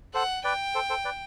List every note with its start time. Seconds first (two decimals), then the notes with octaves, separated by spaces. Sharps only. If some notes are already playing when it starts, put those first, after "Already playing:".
0.14 A4 C5 F#5
0.44 B4 D5 G5
0.75 A4 C5
0.90 A4 C5
1.05 B4 D5